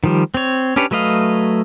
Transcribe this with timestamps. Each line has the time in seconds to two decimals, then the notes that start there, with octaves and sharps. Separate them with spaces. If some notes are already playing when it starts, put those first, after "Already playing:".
0.04 D#3 F3 G3
0.34 C4 C#5
0.76 C#4 D4 G4 B4 C#5
0.91 F#3 A3 B4 D#5 F5